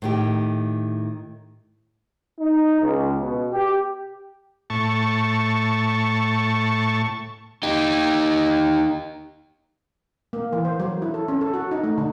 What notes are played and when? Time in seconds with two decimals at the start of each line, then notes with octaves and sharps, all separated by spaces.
0.02 A2 D#3 G4
2.39 D#4
2.82 C#2
3.19 B2
3.52 G4
4.70 A2 A5 C#6
7.63 D#4 G4
10.33 A#3
10.53 E3
10.65 C5
10.80 F#3
11.02 E4
11.14 A4
11.28 C#4
11.41 A4
11.54 F#4
11.71 D#4
11.84 A3
11.98 D3